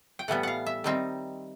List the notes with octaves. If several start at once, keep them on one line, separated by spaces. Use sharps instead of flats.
G5
A2 E3 G3 B3 F#5
F5 F#5
E5
D#3 G3 C4 D#4